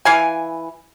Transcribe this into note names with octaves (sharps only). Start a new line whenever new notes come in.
E3 F5 G#5